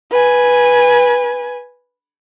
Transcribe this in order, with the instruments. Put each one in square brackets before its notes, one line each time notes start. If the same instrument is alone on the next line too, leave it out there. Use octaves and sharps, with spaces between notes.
[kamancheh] B4 G#5